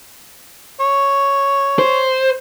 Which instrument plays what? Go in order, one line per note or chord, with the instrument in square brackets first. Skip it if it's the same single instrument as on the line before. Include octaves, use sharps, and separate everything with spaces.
[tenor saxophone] C#5
[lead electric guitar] C5